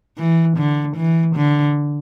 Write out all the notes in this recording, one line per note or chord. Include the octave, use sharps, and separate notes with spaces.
E3
D3
E3
D3